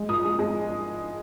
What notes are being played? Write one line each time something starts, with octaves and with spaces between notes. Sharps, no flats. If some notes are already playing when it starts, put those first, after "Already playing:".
Already playing: G#3
A#2 D#6
G#3
G#3